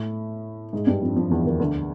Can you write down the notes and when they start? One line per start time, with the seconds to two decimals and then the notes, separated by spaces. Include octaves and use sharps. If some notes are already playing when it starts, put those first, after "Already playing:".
Already playing: A2 A3
0.73 G#2 G#3
0.87 G2 G3
1.02 F2 F3
1.16 F2 F3
1.31 E2 E3
1.45 D#2 D#3
1.60 D2 D3